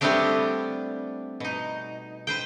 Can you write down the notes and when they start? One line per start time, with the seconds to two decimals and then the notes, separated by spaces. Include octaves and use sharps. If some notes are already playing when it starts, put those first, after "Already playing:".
0.01 G3 A3 B3 C4 D4 G4
1.40 B2 D#4
2.27 B4 C5 G5